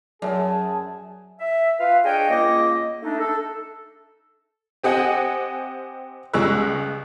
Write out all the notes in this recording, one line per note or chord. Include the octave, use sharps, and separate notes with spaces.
F#2 F#3 G#4 A5
E5
F4 B4 F5
D4 G#4 C#5 D#5 G5
C#2 A#3 D#5
A3 D4 D#4
A4
C4 G4 D#5 F#5 G#5
C#2 G3 G#3 C#6 E6 F#6